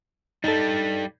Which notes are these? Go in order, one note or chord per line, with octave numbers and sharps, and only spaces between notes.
G3 D4 D#4 A4